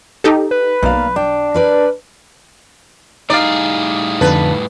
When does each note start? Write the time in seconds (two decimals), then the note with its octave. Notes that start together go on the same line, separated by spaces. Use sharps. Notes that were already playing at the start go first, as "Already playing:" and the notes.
0.24 D#4 G4 A4
0.51 B4
0.83 B1 A#3 D5 F5
1.16 D4 G5
1.54 A#4 B4 D5
3.30 A2 G3 D#4 G#4 D5 F5
4.21 F2 D3 B4 A5